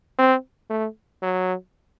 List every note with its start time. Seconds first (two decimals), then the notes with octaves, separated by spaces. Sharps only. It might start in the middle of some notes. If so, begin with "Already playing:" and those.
0.19 C4
0.70 A3
1.23 F#3